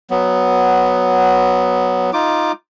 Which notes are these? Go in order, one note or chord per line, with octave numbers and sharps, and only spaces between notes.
F#3 B3
D#4 F4 D6